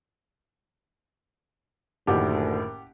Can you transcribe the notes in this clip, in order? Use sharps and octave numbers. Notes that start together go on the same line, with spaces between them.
F#1 D2 A2 D#3 G4 F#5